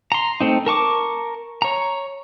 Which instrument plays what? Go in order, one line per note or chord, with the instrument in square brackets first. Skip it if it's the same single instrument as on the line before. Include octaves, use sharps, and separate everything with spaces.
[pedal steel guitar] A#5 C6
A3 C4 D#4
A#4 A5 C#6 D6
C#5 A#5